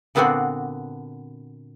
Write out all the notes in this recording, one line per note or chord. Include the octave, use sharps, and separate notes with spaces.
A#2 D3 B3 C4 D4 F#4